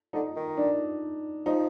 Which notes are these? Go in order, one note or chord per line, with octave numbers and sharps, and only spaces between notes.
D3 D#4
D#3
D4
F3 D#4